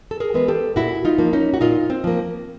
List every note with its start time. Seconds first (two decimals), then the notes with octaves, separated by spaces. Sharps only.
0.11 A4
0.20 G#4 A#4
0.34 E3 G#3 B3 G#4
0.48 G4 A4
0.76 A#2 E4 F#4
1.05 D#4 F4
1.18 F3 A#3
1.33 C#4 D#4
1.54 F#4
1.61 A#2 D#4 F4
1.90 C4
2.04 F3 A#3